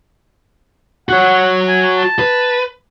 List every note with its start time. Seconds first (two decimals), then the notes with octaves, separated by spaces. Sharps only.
1.09 F#4 C#5 F#5
1.68 G#5
1.96 A5
2.19 B4